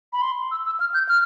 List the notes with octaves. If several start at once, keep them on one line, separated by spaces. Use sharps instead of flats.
B5
C6
E6
E6
F6
G6
F6